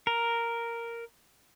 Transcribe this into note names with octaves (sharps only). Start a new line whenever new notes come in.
A#4